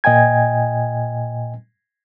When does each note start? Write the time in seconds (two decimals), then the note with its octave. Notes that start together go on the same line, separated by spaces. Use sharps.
0.04 A#2 D#5 G5 G#5 G#6